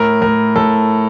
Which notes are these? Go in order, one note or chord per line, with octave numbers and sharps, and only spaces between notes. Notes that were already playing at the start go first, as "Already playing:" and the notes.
Already playing: A2 A#4
A2 A#4
A2 A4